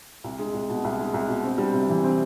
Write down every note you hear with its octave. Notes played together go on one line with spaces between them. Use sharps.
C2
G#3
C2
B2
C2
G#3
C2
B2
C4
G3
C3
E3
C4